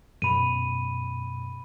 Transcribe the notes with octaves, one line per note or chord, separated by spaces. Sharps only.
F#2 B2 B5 D#7